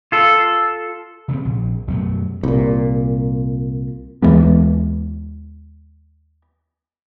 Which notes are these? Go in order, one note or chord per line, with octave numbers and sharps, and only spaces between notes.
F4 A4
C#3 A3 C4
A#1
F#2 B2 F#3 A3
C2 A#2
D#2 E3 G#3 B3